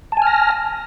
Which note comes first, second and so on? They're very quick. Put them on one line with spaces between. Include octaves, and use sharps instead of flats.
A5 G#5 F6 A#6